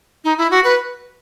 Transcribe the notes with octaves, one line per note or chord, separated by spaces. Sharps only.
D#4
E4
F#4
B4